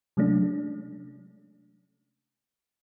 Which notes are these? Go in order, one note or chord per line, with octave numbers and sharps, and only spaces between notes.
C3 F#3 G#3 A3 C#4 D4